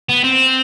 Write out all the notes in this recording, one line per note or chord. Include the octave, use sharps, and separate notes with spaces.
B3
C4